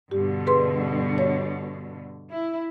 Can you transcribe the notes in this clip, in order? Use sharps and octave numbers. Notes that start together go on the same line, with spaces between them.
G2 B2 D3 G4
G#4 B4 C6
C#5
E4